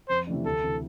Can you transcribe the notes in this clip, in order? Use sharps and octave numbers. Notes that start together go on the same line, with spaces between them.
F2 C5
C3 E3 A3 D4
D2 A4
C3 E3